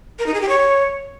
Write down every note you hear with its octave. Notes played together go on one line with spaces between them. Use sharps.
A#4
D#4
G#4
G4
C#5